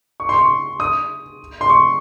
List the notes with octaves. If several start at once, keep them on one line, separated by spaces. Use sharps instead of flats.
C#6
C6
C#6
D#6
C6
C#6